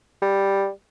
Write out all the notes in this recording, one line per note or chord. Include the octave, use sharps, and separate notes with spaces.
G3